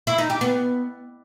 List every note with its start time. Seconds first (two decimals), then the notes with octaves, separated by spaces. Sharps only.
0.07 E4
0.18 D#4
0.30 G4
0.41 B3